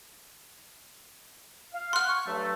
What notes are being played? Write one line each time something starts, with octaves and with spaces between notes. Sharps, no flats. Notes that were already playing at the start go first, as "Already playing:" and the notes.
F5
F#5 C6 F6
C#6
G2 F#3 A3